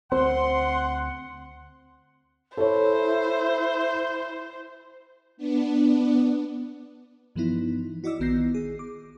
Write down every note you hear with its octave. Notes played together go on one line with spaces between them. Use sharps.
D2 C4 C5 F#5 C6
E4 A4 C5 C#5
B3 D4
G2 E3 F3 B3 D#4 E4
E4 F#4 D5 D#5 D6 E6
A#1 D#3 B3 G6 A#6 C7
G#4
D6